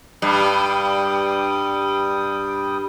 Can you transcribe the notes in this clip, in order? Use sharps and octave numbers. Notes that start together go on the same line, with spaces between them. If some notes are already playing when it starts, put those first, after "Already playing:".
G2 G3 G5 D#6